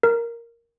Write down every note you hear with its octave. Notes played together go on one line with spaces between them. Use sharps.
A#4